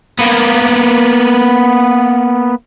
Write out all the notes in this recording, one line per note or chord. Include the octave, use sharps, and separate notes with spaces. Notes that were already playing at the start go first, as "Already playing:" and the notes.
A#3 B3